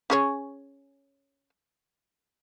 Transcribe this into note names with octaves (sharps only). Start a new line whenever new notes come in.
C#4 G#4 C#5